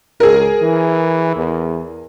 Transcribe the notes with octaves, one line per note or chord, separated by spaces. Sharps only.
C#2 G#4 A#4
E3
E2